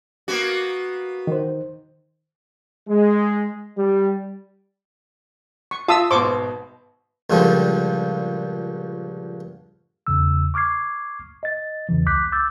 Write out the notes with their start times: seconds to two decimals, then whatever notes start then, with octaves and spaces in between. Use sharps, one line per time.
0.28 A#3 B3 F#4
1.27 D#3 C5
2.89 G#3
3.78 G3
5.71 C#6
5.88 F4 E5 A5 D#6 E6
6.11 G#1 B2 C5 C#6 D6
7.30 C#2 A#2 D3 F3 G3
10.07 E2 C#3 E6
10.54 C#6 D6 F6 G#6 C7
11.43 D#5 A6
11.89 E2 C#3 E3
12.06 C#2 D6 F#6 G6 B6
12.32 D6 E6 G6 A6